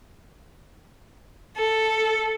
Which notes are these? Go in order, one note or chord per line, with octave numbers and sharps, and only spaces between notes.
A4